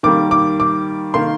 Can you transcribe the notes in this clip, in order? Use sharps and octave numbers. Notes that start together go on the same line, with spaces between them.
D#3 G3 A#3 D6
D6
D6
D#3 A#3 C6